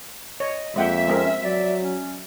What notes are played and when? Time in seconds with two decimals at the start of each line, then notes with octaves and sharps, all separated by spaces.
0.40 C#5 D#5
0.76 F2 G#3 A#3 E5 F#5 G5
1.08 G#3 C4 C#4 A#4
1.44 F#3 D5
1.83 C#4